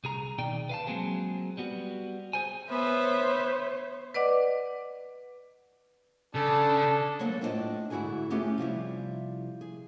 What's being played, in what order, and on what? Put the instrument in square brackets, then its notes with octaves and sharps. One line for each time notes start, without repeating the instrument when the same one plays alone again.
[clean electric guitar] C2 G#4 A#5
D#2 B2 D#4 D5 G5
B4 F5 A5
F#3 G#3 A#3 C4 G#4
G3 B3 F#4
G#4 C5 G#5
[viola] B3 E5 [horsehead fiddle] C5 C#5
[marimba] B4 D5 D#5 F#5 D6
[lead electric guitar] C#3 [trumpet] D4 [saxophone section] A4 [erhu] A5
[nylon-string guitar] F#3 G#3 A#3 B3 C5 C#5
A2 D4 F4 G#4 C5 D#5
D2 G#2 E4 F#4 G#4 G#5
A3 B3 C#4 F4 G4 G#4
C3 F3 G3 E4
G#4